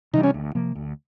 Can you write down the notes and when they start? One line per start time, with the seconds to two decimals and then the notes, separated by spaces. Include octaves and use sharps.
0.13 C3 E3 G3 D#4
0.23 C#4
0.34 D2
0.55 C3 F3 A#3
0.75 D2